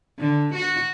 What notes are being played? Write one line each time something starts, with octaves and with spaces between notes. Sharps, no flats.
D3
F#4